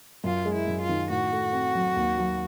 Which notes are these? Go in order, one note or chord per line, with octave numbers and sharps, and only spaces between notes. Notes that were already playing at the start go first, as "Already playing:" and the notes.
F#2 F4
G#3
E4
F#2
F4
D#3
A2 F#4
A3
C4
F#3
D#2
F#3